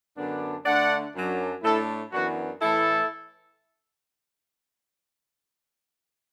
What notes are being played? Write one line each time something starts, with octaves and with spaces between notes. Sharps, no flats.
F#2 D3 B3 D4
D3 A3 D4 D5 F#5
F#2 F#3 D4
A2 A3 D4 E4 A4
F#2 E3 B3 D4 F#4
A2 E3 A3 E4 A4